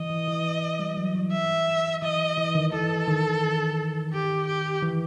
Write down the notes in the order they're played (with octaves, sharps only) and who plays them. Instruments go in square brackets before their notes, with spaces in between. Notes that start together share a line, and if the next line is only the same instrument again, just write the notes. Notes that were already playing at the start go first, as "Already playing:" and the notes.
Already playing: [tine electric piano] E3 [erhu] D#5
[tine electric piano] E3
E3
G3
F#3
E3
[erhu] E5
[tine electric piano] E3 [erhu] D#5
[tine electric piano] E3
D#3
[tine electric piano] E3 [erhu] A4
[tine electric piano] D#3
[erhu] G4
G4
[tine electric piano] E3